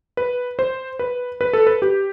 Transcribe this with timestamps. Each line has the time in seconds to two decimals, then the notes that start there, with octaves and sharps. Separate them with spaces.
0.17 B4
0.59 C5
0.99 B4
1.41 B4
1.53 A4
1.67 B4
1.82 G4